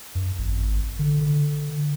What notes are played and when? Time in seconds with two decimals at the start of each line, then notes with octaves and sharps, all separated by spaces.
0.15 F#2
0.39 G#1
0.99 D3
1.21 D3